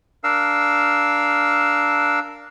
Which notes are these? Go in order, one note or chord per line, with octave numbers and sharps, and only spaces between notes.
D4 A#4 F5 E6